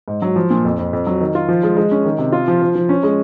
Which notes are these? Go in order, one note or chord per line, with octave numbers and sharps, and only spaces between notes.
G#2
F#3
F3
A#2
F2
F2
F2
F#3
D#3
F4
F3
G#3
G#3
C#4
D#3
C3
F4
F3
F3
F3
C#4
G#3